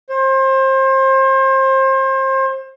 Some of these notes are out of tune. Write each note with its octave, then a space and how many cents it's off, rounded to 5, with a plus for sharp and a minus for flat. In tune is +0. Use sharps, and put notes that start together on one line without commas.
C5 +30